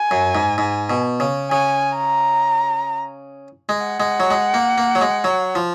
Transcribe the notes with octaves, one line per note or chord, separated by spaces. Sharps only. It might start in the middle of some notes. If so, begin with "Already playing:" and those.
Already playing: G#5
F#2
G#2
G#2
B2
C#3
C#3 G#5
A#5
G#3
F#5
G#3
F#3
G#3
A#3
A#3
F#3
G#3
F#3
F3